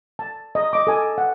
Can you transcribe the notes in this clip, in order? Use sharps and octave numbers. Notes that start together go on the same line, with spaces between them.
A5
D#5
D#5 D6
A4 G#5 D6
F#5